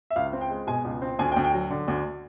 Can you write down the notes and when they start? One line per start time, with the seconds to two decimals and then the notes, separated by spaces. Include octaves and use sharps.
0.10 E5
0.16 C#2 F5
0.33 C4
0.41 G5
0.50 G#3
0.67 B2 G#5
0.85 C#2
1.02 C4
1.19 D2 G#5
1.32 G5
1.36 D2
1.44 G5
1.54 F#3
1.70 D3
1.88 D2